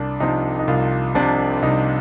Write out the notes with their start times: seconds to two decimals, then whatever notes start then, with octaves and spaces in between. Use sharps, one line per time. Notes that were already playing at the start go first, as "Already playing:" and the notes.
Already playing: C2 D4
0.20 C3 F3 D#4
0.59 D#4
0.67 C2 F4
1.15 C3 F3 D4
1.62 C2 D#4